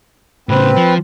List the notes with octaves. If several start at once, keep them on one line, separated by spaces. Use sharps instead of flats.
A2 C#3 C4 B4
F3